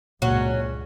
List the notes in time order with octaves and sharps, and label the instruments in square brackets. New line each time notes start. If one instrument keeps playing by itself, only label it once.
[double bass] C#2 G2 [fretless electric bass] A#2 [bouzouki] F#3 C#4